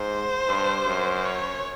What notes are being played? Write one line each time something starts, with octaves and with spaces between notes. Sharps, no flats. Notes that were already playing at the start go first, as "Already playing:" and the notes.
Already playing: G#2 C5
G2
F#2
C#5